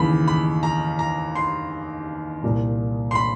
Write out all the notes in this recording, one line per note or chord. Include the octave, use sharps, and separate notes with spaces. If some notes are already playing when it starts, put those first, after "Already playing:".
Already playing: D#2 C#3 E3 B5
B5
A#5
A#5
C6
C2 A#2
C6
B5